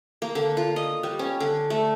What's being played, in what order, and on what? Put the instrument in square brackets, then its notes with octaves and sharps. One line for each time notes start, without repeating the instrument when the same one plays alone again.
[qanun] A#3
D3
F4
D#5
G3
C#4
D3
A3